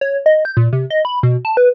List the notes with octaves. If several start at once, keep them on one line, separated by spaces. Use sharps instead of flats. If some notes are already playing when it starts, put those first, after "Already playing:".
C#5
D#5
G6
A#2
C3
D#5
B5
B2
A5
B4